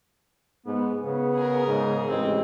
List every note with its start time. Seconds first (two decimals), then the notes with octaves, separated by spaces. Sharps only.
0.66 G#2 B3
1.02 C#3 B3
1.35 G#4 A#4
1.67 G#2
2.08 A1 G#3 C4